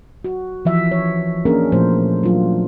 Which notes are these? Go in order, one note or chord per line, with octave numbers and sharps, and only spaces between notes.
F#4
E3 F3 E5
C#5
A#3 C#4 D4 G#4 A#4
A#2 F3 A3 C5
F#3 D4 F4